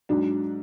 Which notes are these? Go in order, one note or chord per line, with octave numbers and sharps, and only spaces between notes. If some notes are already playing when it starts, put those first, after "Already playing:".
G#2 F#3 D4